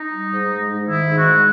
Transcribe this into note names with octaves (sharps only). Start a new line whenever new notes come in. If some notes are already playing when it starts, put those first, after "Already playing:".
Already playing: D#4
G3
G#2
G#3
G#2
D#3 E4
G#2
F#4
G#3